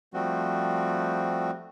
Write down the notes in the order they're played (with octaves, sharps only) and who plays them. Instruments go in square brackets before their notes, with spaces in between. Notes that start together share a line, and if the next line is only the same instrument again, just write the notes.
[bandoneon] F3 G3 A3 C4 F#4